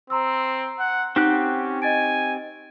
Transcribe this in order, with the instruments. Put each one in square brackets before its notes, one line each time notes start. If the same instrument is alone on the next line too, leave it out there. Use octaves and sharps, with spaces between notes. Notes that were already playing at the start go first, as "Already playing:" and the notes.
[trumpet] C4 [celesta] A#5 C6 E6
[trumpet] F#5
[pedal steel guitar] C4 G4 F#6 [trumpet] C#4 [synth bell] D#4 [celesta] F#5
[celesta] D#5 A6 D7 [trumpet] G#5